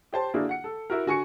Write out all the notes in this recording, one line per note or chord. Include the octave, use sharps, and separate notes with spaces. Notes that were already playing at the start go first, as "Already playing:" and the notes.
G4 C5 A5 C6
D3 A#3 D4 E4 F#4 G#4
F#5 C#7
A4
E4 F#4 A#4
D3 F#4 G#5 C#6 C#7